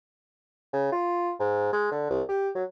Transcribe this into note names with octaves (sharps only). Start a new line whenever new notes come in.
C#3
F4
G#2
G#3
D3
C2
G4
F#3